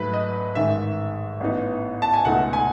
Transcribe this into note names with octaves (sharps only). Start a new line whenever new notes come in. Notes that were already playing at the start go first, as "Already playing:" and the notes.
Already playing: G#2 F#3 A3 B4
D#5
A1 G#2 D#3 G#3 E5
A1 A2 E3 B3 D#4
A5
G#5
C#2 B2 A3 D#4 F#5
G#5